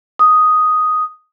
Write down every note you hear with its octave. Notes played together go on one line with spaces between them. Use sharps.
D#6